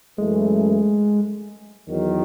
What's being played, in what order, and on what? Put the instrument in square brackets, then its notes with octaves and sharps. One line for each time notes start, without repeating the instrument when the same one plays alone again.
[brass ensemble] F#2 E3 A3 [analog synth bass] G#3
[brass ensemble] E2 D#3 F#3